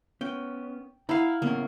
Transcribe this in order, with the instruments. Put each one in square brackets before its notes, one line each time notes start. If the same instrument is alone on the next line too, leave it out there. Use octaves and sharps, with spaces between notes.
[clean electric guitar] B3 C#4 [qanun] G5
[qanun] E4 F5 [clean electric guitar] F#5 A#5 B5
[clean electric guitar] C#3 B3 C#4 [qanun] A#3